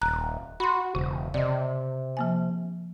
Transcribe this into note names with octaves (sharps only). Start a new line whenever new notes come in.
D#1 A#5 F#6
F#4 B5 C6
E1 C#3
C3 D5 D#5
F3 A#3 G#5